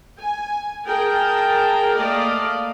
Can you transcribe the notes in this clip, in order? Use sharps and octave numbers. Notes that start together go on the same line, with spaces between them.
G#5
G#4 A#4 G5 A5
A3 A#3 D5 D#5 F5